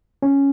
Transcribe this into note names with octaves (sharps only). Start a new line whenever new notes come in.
C#4